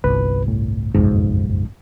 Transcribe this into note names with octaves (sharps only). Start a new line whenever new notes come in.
G1 C2 B4
A2
F#1 B1 F2 G#2